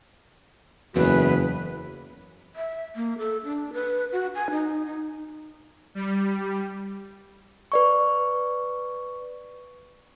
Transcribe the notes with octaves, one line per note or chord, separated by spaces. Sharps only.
F#1 E2 F#4 B4
E5
A#3
A4
D4
B4
F#4
G#5
D#4
D#4
G3
B4 D5 C#6